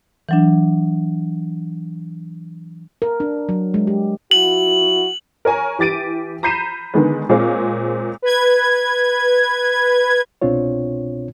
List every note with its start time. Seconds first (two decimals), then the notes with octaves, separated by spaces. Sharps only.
0.29 E3 F#3 D4
3.02 A#4
3.20 D4
3.49 F#3
3.74 G#3
3.87 G4
4.31 F3 E4 F#4 F#7
5.45 A#4 C#5 G#5 A#5
5.79 E3 G4 A6 D7 D#7
6.43 A#5 B5 G6 C7 D#7 E7
6.94 D3 D#3 G#3 B3
7.29 A#2 G#3 C4 G#4 C#5 F5
8.22 B4 G#6
10.42 C2 B2 C4 D4 F4 C#5